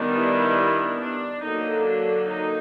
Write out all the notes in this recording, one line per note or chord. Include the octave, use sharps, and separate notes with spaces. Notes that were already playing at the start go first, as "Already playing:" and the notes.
Already playing: D#3 G3 B3 D4
E4
D4
D3 F#3 A#3 D#4
D4
D#4